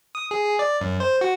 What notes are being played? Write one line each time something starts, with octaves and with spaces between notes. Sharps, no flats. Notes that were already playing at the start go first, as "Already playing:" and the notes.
D#6
G#4
G#4
D5
F#2
C5
F#4